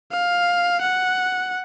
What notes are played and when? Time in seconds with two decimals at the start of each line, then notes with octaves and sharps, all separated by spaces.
0.12 F5
0.81 F#5